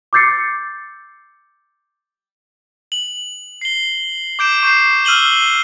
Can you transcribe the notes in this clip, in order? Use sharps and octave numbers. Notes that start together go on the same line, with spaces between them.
D6 E6 G6 A6 C7 C#7
F#7
C7 G7
D6 G6 D7 E7
C#6 G6 C7
E6 F6 D#7 F#7 G7